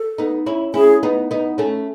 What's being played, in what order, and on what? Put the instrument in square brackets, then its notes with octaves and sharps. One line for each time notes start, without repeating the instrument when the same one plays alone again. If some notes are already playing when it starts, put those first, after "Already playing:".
Already playing: [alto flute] A4
[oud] B3 D#4
C#4 E4
[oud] C#4 E4 [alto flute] G#4
[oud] B3 D#4
B3 D#4
A3 C#4